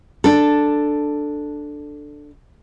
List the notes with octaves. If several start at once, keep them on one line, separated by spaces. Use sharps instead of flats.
D4 A4